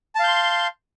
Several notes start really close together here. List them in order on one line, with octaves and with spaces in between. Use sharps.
A5 F5 G6 C6